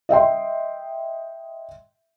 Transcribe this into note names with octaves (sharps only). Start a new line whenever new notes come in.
D#5 E5 G5 C6